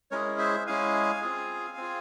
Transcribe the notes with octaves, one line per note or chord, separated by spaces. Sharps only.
G#3 C#4 E4 G#4 A#4 C#5
C5 E5
G#3 C#4 E4 G#4 F5 G#5
C4 F4 G#4
C4 F4 G#4